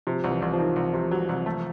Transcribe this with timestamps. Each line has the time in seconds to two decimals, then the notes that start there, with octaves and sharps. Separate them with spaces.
0.07 C3 F3
0.24 C2
0.30 E3
0.42 C2
0.53 F3
0.58 D#3
0.76 C2
0.94 C3
1.11 F#3
1.29 C2
1.46 A3